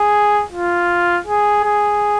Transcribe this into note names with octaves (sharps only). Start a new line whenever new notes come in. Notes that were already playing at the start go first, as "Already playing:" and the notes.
Already playing: G#4
F4
G#4
G#4